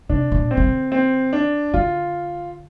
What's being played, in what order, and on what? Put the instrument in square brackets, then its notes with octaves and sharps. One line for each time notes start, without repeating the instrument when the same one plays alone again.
[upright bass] C3 [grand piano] D4
[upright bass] C3
A#2
[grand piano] C4
[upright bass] C3
D3
[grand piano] C4
D4
[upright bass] D3 [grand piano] F4